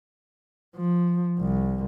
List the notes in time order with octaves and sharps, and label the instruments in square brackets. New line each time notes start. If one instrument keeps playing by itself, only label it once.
[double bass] F3
C2